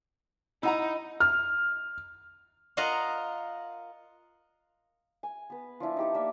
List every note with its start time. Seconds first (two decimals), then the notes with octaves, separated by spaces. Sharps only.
0.63 D#4 E4 F#5 A#5
1.20 F6
2.77 F4 A#4 D#5 F5 F#5
5.23 G#5
5.50 B3 B4
5.80 F3 D4 E4 D5
5.97 D#4 G4 A4
6.14 A#3 D5 E5